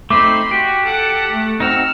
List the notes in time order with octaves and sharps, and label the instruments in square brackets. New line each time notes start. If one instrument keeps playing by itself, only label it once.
[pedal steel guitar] A3 C4 D#4 [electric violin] B5 C6 [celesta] D6
[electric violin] F#4 [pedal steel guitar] G4
[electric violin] A4 F#5
[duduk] A3
[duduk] C4 [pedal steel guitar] D#4 F#4 [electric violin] E6 F6